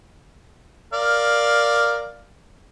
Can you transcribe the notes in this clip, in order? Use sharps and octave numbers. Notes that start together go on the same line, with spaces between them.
A#4 D5 F5